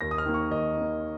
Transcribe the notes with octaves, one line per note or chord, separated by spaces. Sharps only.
D#2 A#6
D#6
F6
D#3 A#3
C#6
D#2 D#5
D#3 A#3